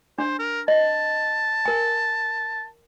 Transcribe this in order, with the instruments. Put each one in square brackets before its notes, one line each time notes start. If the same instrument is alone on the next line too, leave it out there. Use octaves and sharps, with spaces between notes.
[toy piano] D4 [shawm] C5
[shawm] A#4
[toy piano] D#5 [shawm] A5
[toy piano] A#4 G#5